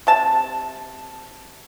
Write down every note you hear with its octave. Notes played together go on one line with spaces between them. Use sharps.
C3 A5